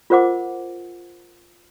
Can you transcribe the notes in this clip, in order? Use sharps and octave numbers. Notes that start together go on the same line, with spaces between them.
F4 A#4 C5 F#5 D6